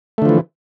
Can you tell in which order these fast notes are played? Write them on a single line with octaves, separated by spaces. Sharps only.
A3 D3 F3 E3